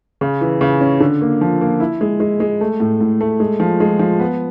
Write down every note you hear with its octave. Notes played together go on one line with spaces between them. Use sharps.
C#3
E3
C#3
C#4
D3
A#3
F3
A#3
E4
G#3
G#3
G#3
A3
A2
A2
A3
G#3
F3
G#3
F3
B3